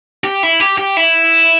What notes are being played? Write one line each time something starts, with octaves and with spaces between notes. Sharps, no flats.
G4
E4
G4
G4
E4